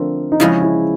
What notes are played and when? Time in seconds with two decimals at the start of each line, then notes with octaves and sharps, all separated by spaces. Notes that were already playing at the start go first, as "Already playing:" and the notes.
Already playing: D3 F3 A3 C4 A#4
0.32 D#4
0.40 C#3 F3 G#3 E4
0.63 E4